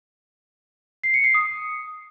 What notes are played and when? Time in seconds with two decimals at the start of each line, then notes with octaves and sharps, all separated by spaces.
1.04 C7
1.14 C#7
1.24 C7
1.34 D#6